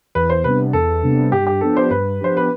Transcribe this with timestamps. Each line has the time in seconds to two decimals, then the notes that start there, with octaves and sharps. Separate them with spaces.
0.15 E2 B4
0.30 C5
0.44 C3 G3 B3 D4 B4
0.73 E2 A4
1.03 C3 G3 B3 D4
1.32 G2 G4
1.47 G4
1.61 F3 B3 D4 G4 A4
1.77 C5
1.90 G2 B4
2.20 F3 B3 D4 G4 C5
2.37 B4